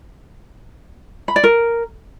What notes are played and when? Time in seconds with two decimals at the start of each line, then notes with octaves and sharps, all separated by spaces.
1.28 B5
1.36 D5
1.44 A#4